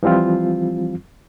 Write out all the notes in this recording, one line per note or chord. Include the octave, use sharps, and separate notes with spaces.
E3 F3 G3 C4 F4